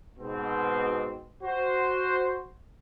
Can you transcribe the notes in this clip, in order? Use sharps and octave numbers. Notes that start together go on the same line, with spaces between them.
G#2 B2 C4
F#4 C5